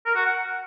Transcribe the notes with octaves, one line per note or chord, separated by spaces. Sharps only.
A#4
F#4
F#5